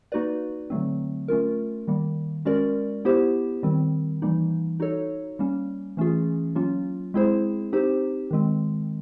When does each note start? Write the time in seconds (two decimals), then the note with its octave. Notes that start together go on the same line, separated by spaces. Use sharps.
0.12 A#3 D#4 F#4 B4 D5
0.70 D3 F#3 A3 C4
1.28 A3 C#4 F4 A#4
1.87 D#3 G3 A#3
2.45 G#3 C#4 F#4 A#4 D5
3.05 B3 E4 G4 C5
3.63 D#3 G3 C4
4.22 E3 G3 A#3 D#4
4.80 D#4 F#4 A4 C#5
5.39 G3 A#3 C#4
5.97 E3 A3 C#4 F4 G#4
6.55 F#3 A#3 C#4 F4
7.14 G#3 C4 E4 G#4 C5
7.73 C4 D#4 G4 C5
8.31 D#3 G#3 C4